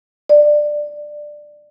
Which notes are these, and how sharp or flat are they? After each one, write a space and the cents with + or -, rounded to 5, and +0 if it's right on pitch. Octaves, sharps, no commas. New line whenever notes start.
D5 +15